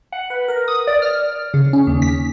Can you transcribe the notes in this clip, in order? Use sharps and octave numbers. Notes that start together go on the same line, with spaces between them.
F#5
B4
A#4
D#6
D5
F6
C#3
C#4
D#2
B6